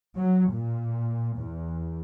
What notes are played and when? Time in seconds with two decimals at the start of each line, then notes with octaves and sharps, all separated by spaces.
0.17 F#3
0.52 A#2
1.38 E2